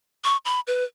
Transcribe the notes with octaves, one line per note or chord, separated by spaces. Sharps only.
C#6
B5
B4